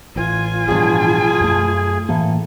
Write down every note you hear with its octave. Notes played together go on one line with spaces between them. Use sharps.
A1 F4 G#5
A1 G2 B2 F3 G#4
F#2 A3
A2 E3 A#3 A4